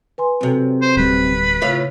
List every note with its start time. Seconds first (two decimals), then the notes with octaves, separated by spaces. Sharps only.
0.18 B4 G#5 C6
0.41 F#2 C3 C4 F#4 A4
0.82 C5
0.97 D1 G3 B4
1.62 A2 C#3 F4 C#5 F5